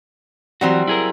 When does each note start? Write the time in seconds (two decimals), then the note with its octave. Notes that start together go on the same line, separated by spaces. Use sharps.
0.61 E3 F#3 G3 C4 F#4
0.87 E4 G#4 A#4